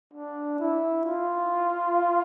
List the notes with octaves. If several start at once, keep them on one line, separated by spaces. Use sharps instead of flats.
D4
E4
F4